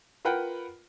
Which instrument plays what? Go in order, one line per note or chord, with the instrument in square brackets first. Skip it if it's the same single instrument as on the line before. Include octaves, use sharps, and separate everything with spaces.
[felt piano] F4 A#4 B4 F#5 G5